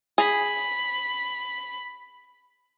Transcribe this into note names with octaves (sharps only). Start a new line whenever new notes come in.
G#4 B5